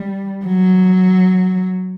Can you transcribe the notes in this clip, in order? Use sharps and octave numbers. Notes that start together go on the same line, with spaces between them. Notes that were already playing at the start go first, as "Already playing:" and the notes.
Already playing: G3
F#3